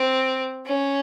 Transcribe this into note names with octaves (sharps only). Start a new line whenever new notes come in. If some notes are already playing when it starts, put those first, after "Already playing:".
Already playing: C4
C#4